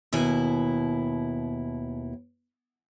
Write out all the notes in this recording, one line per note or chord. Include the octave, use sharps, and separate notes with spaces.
D#2 B2 E4 G#5